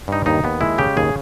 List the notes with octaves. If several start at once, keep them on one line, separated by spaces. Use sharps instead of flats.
G2 D#4
D#2 D#4
D#2 B3
G#3 E4
C#3 G4
D#2 G#4